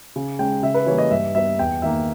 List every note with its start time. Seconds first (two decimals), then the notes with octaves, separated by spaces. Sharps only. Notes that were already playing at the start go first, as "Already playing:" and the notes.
0.16 C#3
0.39 G#3 C#4 G5
0.63 C#3 E5
0.74 B4
0.86 E3 G3 A#3 C#5
0.98 D#5
1.11 G2 E5
1.35 G3 B3 E5
1.59 E2 G5
1.82 D#3 A#3 E5